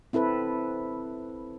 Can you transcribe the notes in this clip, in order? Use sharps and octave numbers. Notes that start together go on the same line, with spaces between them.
C4 E4 A4 B4